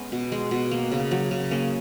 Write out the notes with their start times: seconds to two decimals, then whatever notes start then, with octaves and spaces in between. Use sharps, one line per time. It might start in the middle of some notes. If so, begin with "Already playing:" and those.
Already playing: G#3 B3 C#4
0.12 B2
0.32 G#3
0.51 B2
0.71 A#3
0.92 C#3
1.11 F#3
1.31 C#3
1.51 A#3 C#4